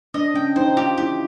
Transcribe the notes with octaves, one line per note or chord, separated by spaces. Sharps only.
D4 D#5
C#4 G5
D#4 C5
F4 G4
E4 G4